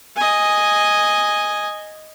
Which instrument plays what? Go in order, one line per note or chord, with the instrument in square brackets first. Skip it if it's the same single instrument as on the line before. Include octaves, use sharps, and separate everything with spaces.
[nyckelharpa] D#5 G#5